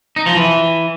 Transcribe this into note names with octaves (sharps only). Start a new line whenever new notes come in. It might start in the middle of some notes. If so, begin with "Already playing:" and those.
D#4
F3
E3